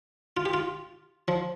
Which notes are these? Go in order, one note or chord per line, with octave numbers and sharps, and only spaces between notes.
F4
G4
F4
F3